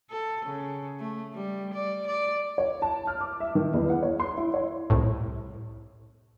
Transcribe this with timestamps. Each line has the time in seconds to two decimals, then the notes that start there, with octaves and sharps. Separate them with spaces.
0.10 A4
0.45 C#3
0.99 A3
1.34 G3
1.74 D5
2.07 D5
2.58 C#5
2.82 A5
3.07 F6
3.21 D6
3.40 E5
3.55 D#3
3.74 E2
3.90 F#5
4.03 C#5
4.20 C6
4.37 E4
4.54 C#5
4.90 C2 A2